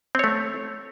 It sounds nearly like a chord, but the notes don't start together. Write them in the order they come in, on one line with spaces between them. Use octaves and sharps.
C4 C#5 A3